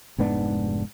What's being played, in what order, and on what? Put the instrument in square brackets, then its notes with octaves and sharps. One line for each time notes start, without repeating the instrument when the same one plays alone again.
[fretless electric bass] F1 G#2 B3 D4